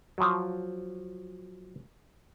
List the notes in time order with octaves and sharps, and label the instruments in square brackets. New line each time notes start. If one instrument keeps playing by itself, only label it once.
[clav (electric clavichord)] F3 F#3